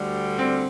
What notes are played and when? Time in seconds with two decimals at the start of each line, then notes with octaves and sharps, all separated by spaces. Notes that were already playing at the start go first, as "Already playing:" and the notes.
Already playing: D2 D3 G3
0.39 C4